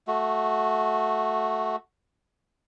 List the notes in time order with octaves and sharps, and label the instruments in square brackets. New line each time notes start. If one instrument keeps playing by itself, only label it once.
[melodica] A3 F#4